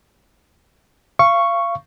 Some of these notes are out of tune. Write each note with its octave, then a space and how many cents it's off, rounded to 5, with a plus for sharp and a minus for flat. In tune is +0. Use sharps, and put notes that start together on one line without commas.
F5 -30 C#6 +0